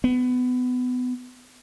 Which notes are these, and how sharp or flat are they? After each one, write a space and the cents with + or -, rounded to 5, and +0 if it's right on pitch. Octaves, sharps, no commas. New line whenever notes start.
B3 +20